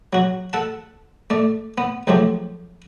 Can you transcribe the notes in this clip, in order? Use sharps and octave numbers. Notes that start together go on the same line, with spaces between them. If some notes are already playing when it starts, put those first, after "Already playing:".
F#3 F#4
A4 F#5 A5
A3 D5
B3
C#2 F3 F#3 A3 G4